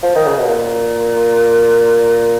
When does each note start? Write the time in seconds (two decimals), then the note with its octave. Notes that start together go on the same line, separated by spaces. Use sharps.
0.03 F3
0.15 D#3
0.26 C#3
0.38 B2
0.49 A#2